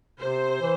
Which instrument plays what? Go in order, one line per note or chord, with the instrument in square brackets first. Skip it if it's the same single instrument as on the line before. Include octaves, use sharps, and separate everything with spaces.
[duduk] C3 [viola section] C5
[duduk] E3